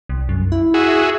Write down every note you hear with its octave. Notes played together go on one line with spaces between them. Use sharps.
C2
F#2
E4
F#4 G#4 E5